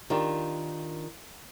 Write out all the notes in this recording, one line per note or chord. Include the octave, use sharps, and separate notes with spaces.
D#3 D4 F4 G4